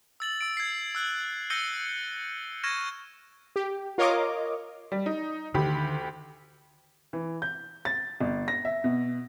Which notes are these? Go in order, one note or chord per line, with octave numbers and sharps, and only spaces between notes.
E6 A6 F#7
E6 D7
G#6 C7
E6 F#6 F#7
E6 G6 A#6 C#7 D#7 G7
C#6 F6 G#6 A#6 D#7 E7
G4
F4 A#4 C#5 D#5 F5 D6
G3
D#4
D2 D3 D#3 G4 B5
E3
G6
A6
G1
A#6
E5
B2